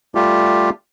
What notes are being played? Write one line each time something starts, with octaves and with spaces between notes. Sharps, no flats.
G3 A3 F4 G4